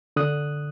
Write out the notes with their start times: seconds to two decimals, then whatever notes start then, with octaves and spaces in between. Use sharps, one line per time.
0.16 D3 D#6 F#6